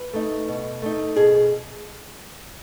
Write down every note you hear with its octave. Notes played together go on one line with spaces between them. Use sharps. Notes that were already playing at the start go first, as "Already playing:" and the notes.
Already playing: B4
A3 D#4
B2
A3 D#4
B2 G#4